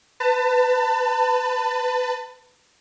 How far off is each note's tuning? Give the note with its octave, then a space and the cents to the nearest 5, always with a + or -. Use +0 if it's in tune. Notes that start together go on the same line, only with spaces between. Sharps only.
B4 +20 A5 +30